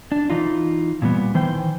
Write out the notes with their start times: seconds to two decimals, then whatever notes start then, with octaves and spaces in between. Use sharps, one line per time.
0.12 D4
0.30 E3 D#4 F4
1.02 A#2 G3 B3
1.34 D#3 E3 C5 G5